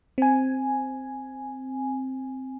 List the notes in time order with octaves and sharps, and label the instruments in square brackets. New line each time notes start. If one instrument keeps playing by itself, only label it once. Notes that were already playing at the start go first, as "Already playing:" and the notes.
[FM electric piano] C4 G#5